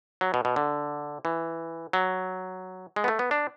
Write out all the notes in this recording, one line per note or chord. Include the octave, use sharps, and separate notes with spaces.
F#3
B2
B2
D3
E3
F#3
G#3
B3
A3
B3
D4